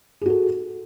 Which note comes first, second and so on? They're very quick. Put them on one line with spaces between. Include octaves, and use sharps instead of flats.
G#4 F#4 A4